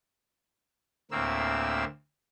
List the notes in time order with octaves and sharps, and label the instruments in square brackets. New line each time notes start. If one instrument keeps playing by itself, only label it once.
[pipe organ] D2 A2 A#3 C4 E6